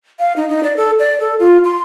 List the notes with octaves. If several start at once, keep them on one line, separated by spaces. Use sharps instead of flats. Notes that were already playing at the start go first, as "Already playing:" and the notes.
F5
D#4
D#4
D5
A4
D5
A4
F4
C6